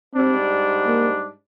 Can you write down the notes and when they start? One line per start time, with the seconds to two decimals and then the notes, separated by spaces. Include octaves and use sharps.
0.15 G#2 G3 C4 D4
0.87 A#3